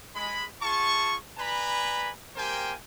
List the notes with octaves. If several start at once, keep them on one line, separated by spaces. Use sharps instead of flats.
G#3 B5
F4 G#4 A5 C#6
B4 D5 G#5 A#5 B5
A#3 G4 A#4 C5 G5 G#5